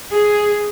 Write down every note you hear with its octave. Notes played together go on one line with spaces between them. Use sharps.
G#4